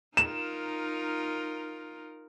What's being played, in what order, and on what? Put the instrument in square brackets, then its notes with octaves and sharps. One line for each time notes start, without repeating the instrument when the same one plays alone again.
[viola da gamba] D#4 F4 A#4 [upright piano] E7